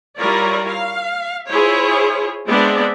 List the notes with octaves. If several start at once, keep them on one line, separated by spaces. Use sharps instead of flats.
G3 E4 F4 A#4 C#5 D5
F5
E4 F4 G#4 C5 C#5
G#3 B3 C4 D4 D5 E5